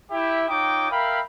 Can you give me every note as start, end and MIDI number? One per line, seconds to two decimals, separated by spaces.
0.11 0.44 64
0.11 0.44 67
0.11 0.44 76
0.49 0.87 63
0.49 0.87 65
0.49 0.87 73
0.49 0.87 79
0.49 0.87 86
0.49 0.87 87
0.91 1.19 70
0.91 1.19 76
0.91 1.19 77
0.91 1.19 79
0.91 1.19 83